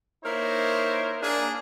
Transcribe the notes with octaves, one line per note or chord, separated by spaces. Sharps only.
A#3 D#4 E4 A#4 C5 C#5
A#3 D4 G#4